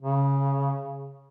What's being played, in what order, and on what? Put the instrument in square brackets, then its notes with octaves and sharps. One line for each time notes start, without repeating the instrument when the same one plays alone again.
[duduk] C#3